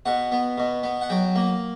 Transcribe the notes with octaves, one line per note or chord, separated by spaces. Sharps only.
B2 F#5
B3
B2
B3
F#5
F#3 G5
A#3